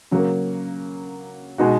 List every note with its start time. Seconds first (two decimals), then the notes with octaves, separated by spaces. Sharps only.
0.11 C#3 F#3 A#3
1.58 B2 G#3 B3 D#4 F#4